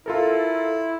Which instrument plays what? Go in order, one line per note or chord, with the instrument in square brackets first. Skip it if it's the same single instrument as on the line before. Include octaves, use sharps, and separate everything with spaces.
[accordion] E4 [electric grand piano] F4 A4 A#4